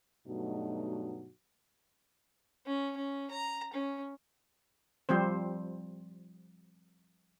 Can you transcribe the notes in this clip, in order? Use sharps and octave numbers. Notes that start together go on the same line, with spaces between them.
G2 B2 F#3 A3 D#4 F#4
C#4
C#4
A#5
C#4
F3 G3 C4 C5